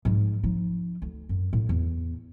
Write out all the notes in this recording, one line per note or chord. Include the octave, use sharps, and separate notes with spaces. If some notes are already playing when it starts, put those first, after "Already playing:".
G#2 F3
F3 D#4
D2
F#2
A2
E2